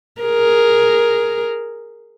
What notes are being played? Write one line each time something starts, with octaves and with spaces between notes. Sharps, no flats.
G#4 A#4